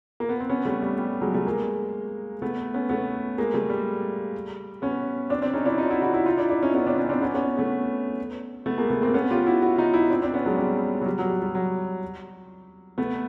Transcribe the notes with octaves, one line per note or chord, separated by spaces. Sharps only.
A#3
B3
C4
B3 C#4
G3 A3
G3
G3
F#3 G#3
G3 A3
G#3 A#3
A3 B3
B3 C#4
A3 B3
G#3 A#3
G3 A3
G3
B3 C#4
C4 D4
C4 D4
C#4 D#4
D4 E4
D#4 F4
E4 F#4
E4 F#4
E4 F#4
D#4 F4
D4 E4
D4 E4
C#4 D#4
B3 C#4
C4 D4
C#4 D#4
C4 D4
B3 C#4
B3 C#4
A3 B3
A3 B3
G#3 A#3
A3 B3
A#3 C4
B3 C#4
F4 G4
E4 F#4
E4 F#4
D#4 F4
E4 F#4
C4 D4
C4 D4
B3 C#4
F#3 G#3
G3
F#3
G3
F#3
G3
G3
F#3
A3 B3